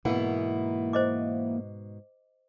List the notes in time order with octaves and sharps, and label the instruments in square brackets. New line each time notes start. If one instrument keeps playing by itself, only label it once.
[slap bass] G#2 B2 [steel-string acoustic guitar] E3 B3 E4 [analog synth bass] A#3 [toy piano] F#5
[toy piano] C5 D#5 D6